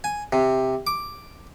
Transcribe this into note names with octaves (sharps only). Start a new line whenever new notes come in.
G#5
C3
D6